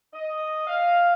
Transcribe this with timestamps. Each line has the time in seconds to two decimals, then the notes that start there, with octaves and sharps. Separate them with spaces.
0.13 D#5
0.67 F5